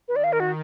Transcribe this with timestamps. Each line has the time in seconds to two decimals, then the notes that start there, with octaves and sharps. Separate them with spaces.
0.08 D#3 B4
0.16 D5
0.24 F5
0.33 A#4
0.40 F#4